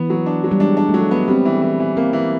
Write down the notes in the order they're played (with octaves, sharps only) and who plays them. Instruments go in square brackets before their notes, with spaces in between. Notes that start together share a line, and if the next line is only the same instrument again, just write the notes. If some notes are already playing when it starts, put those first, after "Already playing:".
Already playing: [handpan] E3 [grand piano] B3
[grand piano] F#3
D4
F#3
[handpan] G3
[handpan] G#3 [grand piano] D4
[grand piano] D4
[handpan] A3
[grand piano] F#3 [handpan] G#3
[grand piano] B3
[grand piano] G3 [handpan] C4
[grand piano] E3
E3
E3
[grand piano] A#3 [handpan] C4
[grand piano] E3